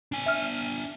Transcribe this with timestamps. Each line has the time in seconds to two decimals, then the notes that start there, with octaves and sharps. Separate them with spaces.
0.12 D4 G#5
0.26 E5 F6